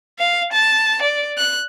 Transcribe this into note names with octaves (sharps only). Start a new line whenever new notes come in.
F5
A5
D5
F#6